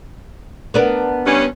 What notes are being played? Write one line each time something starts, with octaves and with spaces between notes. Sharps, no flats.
B3 D4 A#4
G2 C#4